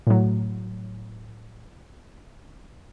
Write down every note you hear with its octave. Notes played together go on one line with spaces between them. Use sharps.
A2 F#3